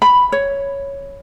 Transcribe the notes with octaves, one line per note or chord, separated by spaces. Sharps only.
B5
C#5